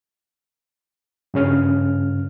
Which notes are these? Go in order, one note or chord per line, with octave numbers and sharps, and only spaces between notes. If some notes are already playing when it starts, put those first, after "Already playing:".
G2 C#3 C#4 F6